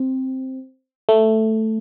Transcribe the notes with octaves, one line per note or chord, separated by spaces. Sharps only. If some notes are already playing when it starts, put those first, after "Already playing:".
Already playing: C4
A3